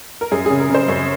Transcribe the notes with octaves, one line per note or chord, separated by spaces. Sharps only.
A#4
F#2 G#4
C#3 G#4
A#4
C#3 C5
F#2 C#5